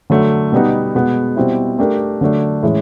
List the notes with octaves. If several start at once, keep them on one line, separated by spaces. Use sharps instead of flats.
D3 F#3 A3
B2 G3 B3 D#4
B2 G#3 B3
B2 G3 C4 E4
A3 D4 G4 A#4
D3 F#3 A3 D4
A2 E3 G#3 C#4 E4